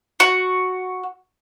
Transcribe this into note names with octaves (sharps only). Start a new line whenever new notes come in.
F#4